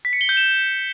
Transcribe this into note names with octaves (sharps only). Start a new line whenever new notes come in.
B6
C#7
G7
G6
E7